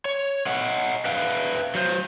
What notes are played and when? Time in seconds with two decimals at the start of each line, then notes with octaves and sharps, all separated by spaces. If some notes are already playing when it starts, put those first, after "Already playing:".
0.05 C#5
0.46 C#5 D#5 F#5
1.05 B4 E5 F5 G5
1.75 F#3 C5